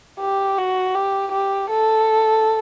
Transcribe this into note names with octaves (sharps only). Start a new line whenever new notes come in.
G4
F#4
G4
G4
A4